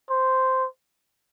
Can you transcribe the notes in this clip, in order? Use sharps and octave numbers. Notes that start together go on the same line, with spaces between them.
C5